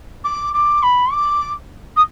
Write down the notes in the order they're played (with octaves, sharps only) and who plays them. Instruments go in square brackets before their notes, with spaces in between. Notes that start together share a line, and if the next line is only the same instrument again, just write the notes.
[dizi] D6
D6
B5
D6
D#6